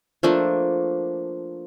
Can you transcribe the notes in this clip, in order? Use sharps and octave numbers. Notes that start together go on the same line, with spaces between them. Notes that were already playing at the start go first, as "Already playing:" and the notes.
F3 A3 A#3 D4